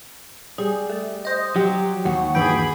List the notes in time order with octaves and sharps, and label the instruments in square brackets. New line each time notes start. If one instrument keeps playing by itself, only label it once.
[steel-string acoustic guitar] G3 [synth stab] G#4
[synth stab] A3
C5 D#5
[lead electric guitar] F#3 [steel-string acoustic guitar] G4
[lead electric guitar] D#2 [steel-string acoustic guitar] F#4
[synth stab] G2 E3 G5 [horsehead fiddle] G#4 B5